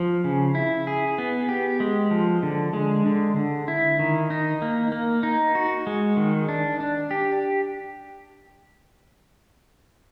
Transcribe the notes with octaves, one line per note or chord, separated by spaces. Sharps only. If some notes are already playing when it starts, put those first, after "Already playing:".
Already playing: F3
C#3
E4
G#4
B3
G4
G#3
F3
D3
G#3
D3
D3
E4
D#3
D#4
A#3
A#3
D#4
F#4
G#3
D#3
D4
D4
G4